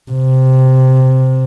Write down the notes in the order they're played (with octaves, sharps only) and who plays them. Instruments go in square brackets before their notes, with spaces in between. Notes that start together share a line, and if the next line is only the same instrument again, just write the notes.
[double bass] C3